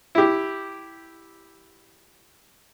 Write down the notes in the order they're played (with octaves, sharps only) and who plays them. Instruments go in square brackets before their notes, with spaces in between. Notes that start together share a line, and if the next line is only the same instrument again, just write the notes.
[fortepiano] E4 G4